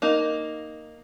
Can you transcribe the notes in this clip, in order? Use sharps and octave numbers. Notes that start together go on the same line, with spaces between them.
A#3 D#4